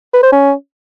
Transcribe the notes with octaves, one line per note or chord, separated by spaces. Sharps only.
B4
C5
C#4